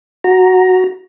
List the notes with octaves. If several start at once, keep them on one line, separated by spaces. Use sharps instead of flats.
F#4 A#5